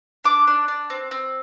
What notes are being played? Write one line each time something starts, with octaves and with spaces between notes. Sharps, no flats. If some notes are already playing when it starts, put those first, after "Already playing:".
D4 D6
D4
D4
C4
C4